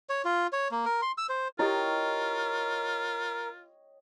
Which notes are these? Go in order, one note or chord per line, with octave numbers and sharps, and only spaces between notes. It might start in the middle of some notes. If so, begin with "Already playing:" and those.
C#5
F4
C#5
A#3
A#4
C6
E6
C5
E4 F4 G4 A#4 C#5 D#5 G5